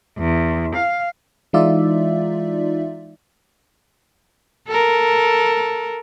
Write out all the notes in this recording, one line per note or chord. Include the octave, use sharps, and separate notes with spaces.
E2
F5
E3 G#3 D#4 F4 D5 E5
A4 A#4